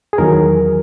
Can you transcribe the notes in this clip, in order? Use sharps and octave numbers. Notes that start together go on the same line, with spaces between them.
G#4
E2 D#3 F#3 A#4